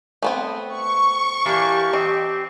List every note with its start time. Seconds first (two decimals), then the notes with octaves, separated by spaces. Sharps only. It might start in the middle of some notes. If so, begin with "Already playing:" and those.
0.22 A3 B3 C4
0.75 C#6
1.46 E3 A#3 D4 G4
1.93 C4 D#5